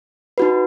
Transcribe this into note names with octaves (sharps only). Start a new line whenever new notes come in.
D#4 F#4 B4